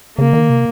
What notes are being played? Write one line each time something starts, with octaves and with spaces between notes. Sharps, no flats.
C#3 A#3
D#3
C3